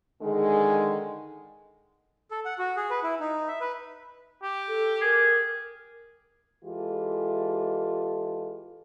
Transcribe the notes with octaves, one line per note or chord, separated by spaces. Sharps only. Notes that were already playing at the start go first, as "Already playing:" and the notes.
D3 D#3 G#3
A4
F#5
F#4
G#4
B4
E4
D#4
E5
B4
G4
A4
G#4 A#4
E3 G#3 F4 G4 A4